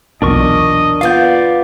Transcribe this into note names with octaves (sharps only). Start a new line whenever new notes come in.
B1 E2 A#2 D4 A#4 D#5 C#6
B3 F4 D5 F5 G6